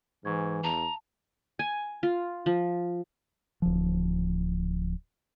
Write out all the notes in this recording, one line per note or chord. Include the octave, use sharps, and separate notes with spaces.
G#2 E3 C#6 G#6
E2 A5 A#5
G#5
F4
F3
D1 F3